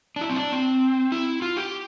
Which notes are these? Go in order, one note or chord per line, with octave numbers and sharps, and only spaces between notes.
D4
E4
C4
D4
C4
E4
F4
G4